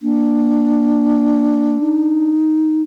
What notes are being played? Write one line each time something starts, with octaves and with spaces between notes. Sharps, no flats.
A#3 D4
D#4